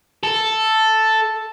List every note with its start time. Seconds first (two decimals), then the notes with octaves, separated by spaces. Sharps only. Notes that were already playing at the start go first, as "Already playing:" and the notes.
0.24 A4